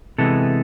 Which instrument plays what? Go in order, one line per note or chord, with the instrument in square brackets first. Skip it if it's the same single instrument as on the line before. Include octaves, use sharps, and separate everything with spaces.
[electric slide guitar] C3 E3 G#3 B3 A4